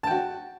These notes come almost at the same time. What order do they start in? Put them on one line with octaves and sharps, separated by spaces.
A5 G5 F#4